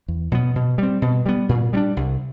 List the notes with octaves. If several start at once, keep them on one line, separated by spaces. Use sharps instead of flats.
E2
B2 F#3 B3
B2
G3 C4
B2
G3 B3
A#2
G3 B3 D4
C2